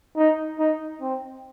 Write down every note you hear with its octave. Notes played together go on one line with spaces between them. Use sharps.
D#4
D#4
C4